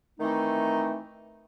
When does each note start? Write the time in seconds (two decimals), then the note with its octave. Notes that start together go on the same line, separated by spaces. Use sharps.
0.20 D#3 E3 A3 C4 D#4